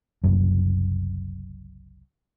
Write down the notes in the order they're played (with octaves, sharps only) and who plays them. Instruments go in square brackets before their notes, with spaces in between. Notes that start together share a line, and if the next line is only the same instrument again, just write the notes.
[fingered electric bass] F#1 C2 F#2